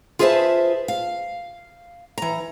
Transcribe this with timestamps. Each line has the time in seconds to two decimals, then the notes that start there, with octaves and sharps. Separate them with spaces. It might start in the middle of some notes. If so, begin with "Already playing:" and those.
0.19 F4 G#4 B4 C5 E5 A5
0.88 F5
2.18 E3 A#5